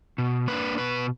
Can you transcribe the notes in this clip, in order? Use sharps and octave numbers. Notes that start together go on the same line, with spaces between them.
B2
A#3 D4 B4
B2 B4